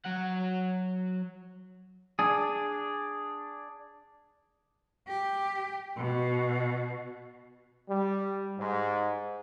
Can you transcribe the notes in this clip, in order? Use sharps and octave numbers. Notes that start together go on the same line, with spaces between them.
F#3 F#5
D4 G#4
G4
B2
G3
G#2